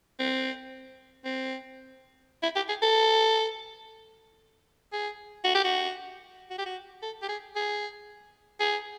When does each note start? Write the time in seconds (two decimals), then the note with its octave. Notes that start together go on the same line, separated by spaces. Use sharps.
0.19 C4
1.25 C4
2.43 E4
2.56 G4
2.69 G#4
2.82 A4
4.93 G#4
5.44 F#4
5.55 G4
5.64 F#4
6.50 F#4
6.58 G4
6.66 F#4
7.02 A4
7.22 G4
7.29 G#4
7.56 G#4
8.60 G#4